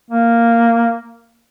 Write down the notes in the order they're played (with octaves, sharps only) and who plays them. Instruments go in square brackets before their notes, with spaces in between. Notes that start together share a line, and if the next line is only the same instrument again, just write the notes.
[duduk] A#3